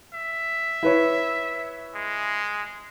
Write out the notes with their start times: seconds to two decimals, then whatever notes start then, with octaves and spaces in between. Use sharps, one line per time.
0.14 E5
0.83 E4 B4 C#5
1.94 G#3